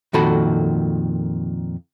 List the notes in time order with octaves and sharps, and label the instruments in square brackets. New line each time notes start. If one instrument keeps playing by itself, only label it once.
[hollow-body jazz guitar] F2 A#2 D#3 F#4 A4 B5